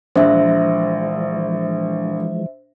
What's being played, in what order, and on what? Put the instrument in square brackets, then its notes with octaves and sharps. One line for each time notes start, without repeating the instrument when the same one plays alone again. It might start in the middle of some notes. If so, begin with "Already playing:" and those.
[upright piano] A#1 [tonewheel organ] E3 F3 G#3 [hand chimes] C5 E5